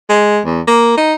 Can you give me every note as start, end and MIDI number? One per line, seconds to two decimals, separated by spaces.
0.09 0.40 56
0.45 0.60 40
0.67 0.95 58
0.97 1.13 63